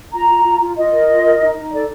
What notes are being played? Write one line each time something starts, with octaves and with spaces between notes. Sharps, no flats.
F4 A#5
F4
F4
F4
F4 D#5
A#4
F4
A#4
D#4
D#4
A4 D5